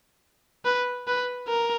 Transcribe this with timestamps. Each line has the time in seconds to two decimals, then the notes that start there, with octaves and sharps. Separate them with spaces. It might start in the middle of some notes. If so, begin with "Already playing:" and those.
0.65 B4
1.07 B4
1.48 A#4